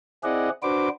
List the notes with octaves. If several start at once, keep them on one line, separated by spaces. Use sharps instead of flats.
C4 E4 G#4 D5 D#5 F#5
D4 F#4 B4 C5 D6